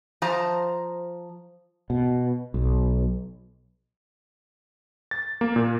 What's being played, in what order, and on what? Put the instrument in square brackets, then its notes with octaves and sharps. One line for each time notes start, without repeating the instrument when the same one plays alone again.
[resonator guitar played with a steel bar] F3 C5 A5 A#5
[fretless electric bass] B2
B1
[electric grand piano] A6
A#3
A#2